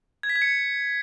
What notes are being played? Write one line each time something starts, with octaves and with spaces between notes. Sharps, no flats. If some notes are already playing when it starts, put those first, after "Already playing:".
G#6
B6
G#6
C#7